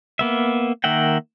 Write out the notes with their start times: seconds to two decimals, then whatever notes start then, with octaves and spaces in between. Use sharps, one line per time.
0.19 A#3 B3 E5
0.84 D#3 A#3 E5 F#5 G5